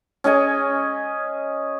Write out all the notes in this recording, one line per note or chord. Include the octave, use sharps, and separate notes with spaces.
C#4 G#4 D#5 G#5